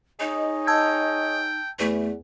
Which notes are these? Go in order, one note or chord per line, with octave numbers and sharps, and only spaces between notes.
D#4 G#4 C#5 D#5
G5 A5 E6 G#6
E2 A3